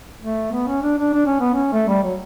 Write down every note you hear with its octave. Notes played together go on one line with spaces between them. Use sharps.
A3
B3
C#4
D4
D4
D4
C#4
B3
C#4
A3
G3
F#3